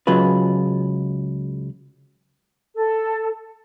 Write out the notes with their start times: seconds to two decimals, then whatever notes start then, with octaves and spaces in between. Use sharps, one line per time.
0.07 C#2 C#3 F#3 G#3 F4 B4
2.75 A4